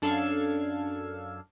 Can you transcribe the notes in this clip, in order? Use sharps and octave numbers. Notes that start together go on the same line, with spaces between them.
F#2 D4 A4 F5 E6 G#6